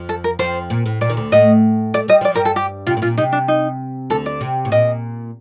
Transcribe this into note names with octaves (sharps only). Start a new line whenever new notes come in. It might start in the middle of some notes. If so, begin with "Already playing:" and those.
Already playing: F2 F3
A4
A#4
F2 F3 C5
A#2
A2
A#2 D5
D#3
D2 D3
A2 A3 D#5
A3 D5
G3 D#5
F3 D5
G2 G3 A#4
A4
G4
C3 F4
A2
A#2 F4
C3 D#4
D4
D#4
D2 D3 A4
D5
C3
A2
A#2 D#5